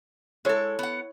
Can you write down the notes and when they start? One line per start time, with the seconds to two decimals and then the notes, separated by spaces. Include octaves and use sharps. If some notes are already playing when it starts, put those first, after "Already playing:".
0.45 G#3 E4 A4 C#5
0.79 B3 F#5